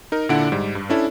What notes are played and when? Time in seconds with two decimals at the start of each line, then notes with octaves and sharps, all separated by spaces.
0.12 D#4 A#4
0.29 A#2 D3 D4 E4 F#5 D7
0.52 G#2 G3
0.75 G2
0.90 C#4 D4 E4 A4